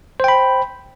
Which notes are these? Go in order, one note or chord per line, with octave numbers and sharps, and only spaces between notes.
C5 G5 B5